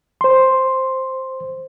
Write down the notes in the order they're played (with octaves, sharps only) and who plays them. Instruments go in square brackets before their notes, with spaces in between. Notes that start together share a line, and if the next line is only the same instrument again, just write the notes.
[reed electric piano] C5 C6